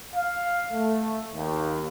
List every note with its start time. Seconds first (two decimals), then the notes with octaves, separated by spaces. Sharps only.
0.14 F5
0.72 A3
1.34 D#2